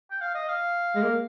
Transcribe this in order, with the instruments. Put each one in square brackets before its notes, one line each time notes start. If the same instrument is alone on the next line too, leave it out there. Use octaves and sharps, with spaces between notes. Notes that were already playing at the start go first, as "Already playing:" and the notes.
[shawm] G5
F5
D#5
F5
[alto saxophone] G#3
A#3